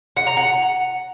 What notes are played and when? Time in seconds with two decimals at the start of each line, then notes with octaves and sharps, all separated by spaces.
0.16 F#5
0.27 A#5
0.37 F#5